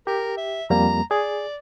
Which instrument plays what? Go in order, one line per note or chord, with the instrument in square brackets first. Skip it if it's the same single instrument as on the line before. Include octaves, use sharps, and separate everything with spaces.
[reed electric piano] G4 [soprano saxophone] A#4
[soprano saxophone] E5
[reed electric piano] F2 G3 A#3 [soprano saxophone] A#5
[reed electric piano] G#4 [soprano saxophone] D5